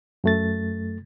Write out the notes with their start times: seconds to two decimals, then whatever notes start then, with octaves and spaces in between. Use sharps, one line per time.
0.24 F#2 A3 A6